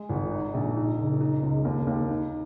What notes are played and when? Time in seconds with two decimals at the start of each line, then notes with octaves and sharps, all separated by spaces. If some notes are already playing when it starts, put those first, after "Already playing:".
Already playing: G#3
0.09 G#1
0.32 D#4
0.54 A#1
0.76 D#4
0.98 F#1
1.21 D#4
1.43 C#2
1.65 D#2
1.87 D#2
2.10 D#4